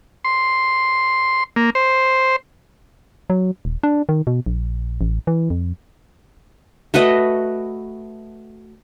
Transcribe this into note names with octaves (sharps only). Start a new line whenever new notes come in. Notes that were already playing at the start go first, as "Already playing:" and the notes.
C6
A#3
C5
F#3
D#1
D4
D#3
B2
A#1
A1
E3
F2
A3 F#4 B4 D#5